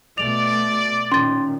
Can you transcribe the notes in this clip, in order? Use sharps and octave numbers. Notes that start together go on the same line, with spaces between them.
B2 A3 D5 F7
A#2 D#3 C#4 C6 A6